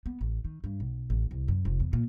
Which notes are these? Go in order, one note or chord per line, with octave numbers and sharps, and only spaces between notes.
B3
A1
D#3
G2
B1
A1
C2
F#2
F1
E2
A#2